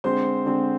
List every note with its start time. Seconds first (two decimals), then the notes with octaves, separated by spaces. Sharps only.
0.04 D3 G#3 C4 C5 C6
0.46 D3 G#3 C4